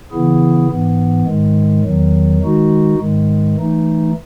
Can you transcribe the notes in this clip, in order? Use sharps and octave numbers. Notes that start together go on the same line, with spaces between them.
C#3 E3 B3 E4 G#4
G#2 E3 B3
G#2 D#3 G#3
E2 D#3 F#3
D#3 G#3 D#4 F#4
G#2 D#3 G#3
E3 A3 D#4